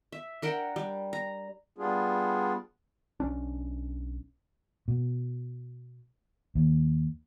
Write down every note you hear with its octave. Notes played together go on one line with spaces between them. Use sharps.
E5
D4 A#4 F#5 G5
G3
A#5
G3 B3 D4 F4 G#4
B1 C#4 D4
B2
D#2